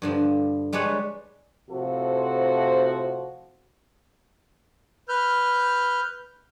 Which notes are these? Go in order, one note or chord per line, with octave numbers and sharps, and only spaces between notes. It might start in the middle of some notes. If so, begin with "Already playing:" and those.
G2 D3 F3
G3 G#3 D4 B4 C#5
A2 C3 F3 F#4 A4 C5
B4 F6 G6